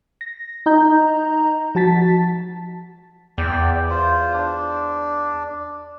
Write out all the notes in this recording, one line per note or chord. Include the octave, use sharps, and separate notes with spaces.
A#6
D#4 D#5 A#5 G6
F3 F#4 A5 A6 B6
E2 D5 G5
F4 C5
D4